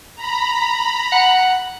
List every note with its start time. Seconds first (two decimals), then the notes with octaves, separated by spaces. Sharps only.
0.15 A#5 B5
1.12 F#5